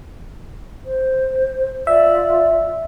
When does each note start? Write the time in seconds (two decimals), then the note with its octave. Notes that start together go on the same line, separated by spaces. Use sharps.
0.86 C5
1.87 F4 D5 E5